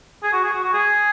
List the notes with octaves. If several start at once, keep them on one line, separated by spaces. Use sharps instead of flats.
G#4
F#4
G#4
F#4
F#4
G#4